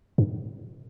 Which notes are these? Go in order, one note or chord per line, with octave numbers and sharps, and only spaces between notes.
G2